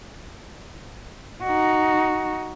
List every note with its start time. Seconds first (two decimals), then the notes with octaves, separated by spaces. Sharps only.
1.43 D#4 F#4